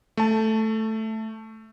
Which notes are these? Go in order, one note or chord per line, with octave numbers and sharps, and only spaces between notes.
A3 A5